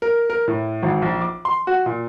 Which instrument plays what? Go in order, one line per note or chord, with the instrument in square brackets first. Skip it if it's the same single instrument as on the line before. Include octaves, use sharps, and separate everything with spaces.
[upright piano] A#4
A#4
A2
G#1
A#1
D6
C6
F#4
A#2